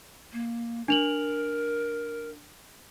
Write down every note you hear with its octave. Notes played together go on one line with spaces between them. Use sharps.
A#3
D4 A#4 F7 F#7